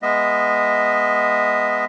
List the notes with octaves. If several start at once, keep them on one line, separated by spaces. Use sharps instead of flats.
G#3 B3 D#5 E5